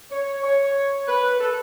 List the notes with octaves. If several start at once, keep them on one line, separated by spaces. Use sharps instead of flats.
C#5
C#5
B4
A4